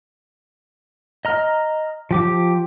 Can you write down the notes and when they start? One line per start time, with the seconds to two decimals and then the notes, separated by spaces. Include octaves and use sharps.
1.25 D#5 A#5 F6
2.11 F3 G4 D6